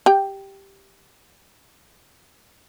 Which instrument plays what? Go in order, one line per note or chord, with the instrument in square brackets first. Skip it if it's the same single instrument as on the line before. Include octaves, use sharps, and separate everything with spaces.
[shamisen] G4 G5